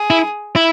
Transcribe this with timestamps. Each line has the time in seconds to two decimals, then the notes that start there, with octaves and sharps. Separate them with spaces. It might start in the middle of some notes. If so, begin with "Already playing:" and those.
Already playing: G#4
0.10 E4
0.56 E4